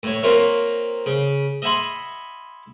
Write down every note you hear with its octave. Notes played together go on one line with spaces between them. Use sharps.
A2 C#5
A#3 C4 F4 A#4 C#5 E5
C#3
D#5 E5 F#5 G#5 B5 C6